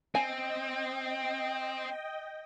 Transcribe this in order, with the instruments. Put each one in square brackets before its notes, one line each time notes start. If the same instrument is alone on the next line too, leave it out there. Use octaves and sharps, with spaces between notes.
[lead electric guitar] C4 [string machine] D#5 G5 [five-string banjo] G#5